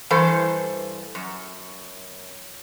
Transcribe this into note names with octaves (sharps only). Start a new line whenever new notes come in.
G2 E3 A4 C5
F#2